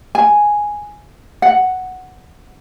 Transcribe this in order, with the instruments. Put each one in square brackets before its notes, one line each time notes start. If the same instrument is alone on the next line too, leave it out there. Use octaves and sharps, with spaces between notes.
[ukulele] G#5
F#5